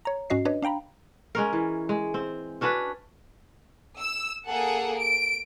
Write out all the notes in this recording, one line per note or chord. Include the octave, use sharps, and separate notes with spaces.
C#5 A#5
G#2 C#4 F#4 D#5 C7
D4 B4 C#5 D#5
D4 F5 G5 A#5 B5
G#3 C#4 A#4
E3
G#3
C4
C#4 D4 F#4 B4
E6
A#3 G#4 A4 F#5
D7